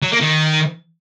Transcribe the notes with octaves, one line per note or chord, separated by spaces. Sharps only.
F#3
A#3
D#3